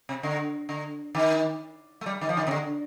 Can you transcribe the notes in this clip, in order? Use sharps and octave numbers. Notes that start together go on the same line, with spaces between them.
C3
D3
D3
D#3
A3
G3
D#3
F3
D#3
C3
D3